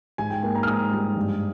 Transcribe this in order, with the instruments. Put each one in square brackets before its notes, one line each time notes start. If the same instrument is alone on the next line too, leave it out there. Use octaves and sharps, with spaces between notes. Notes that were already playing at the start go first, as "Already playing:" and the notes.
[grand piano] G#2 G#5
G5
A#3 G#5
A#5
F6
G#2 D#6
G3
G2